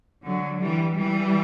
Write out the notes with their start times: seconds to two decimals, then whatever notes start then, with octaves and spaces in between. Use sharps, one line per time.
0.24 D3 F#3
0.60 E3 G3
0.96 E3 G3